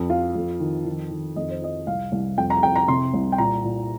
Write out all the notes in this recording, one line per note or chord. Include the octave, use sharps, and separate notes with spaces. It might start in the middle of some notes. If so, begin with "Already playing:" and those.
Already playing: F2
F3 F4
F2
D#3
D#3
D#3
F2 D#5
C5
F3 D#5
C2 F5
C2
F2 G5
A#5
F2 G5
A#5
C3 C6
C2
G5
A#2 A#5
A#2